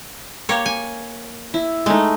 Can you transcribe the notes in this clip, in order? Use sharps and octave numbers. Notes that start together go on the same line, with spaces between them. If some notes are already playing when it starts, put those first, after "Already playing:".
A#3 G4 C#5
G#5
E4
G#3 A3 D#4